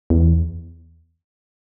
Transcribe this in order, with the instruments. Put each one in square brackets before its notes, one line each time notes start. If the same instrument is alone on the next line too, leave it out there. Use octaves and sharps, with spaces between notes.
[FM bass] E2